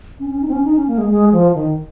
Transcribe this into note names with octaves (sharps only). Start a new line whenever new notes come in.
C#4
C#4
D#4
C4
C#4
D#4
C#4
A#3
G#3
G#3
F3
D#3